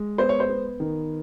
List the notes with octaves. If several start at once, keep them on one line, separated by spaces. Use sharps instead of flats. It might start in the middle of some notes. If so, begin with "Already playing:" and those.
Already playing: G#3
B3 C5
C#5
C5
B3
D#3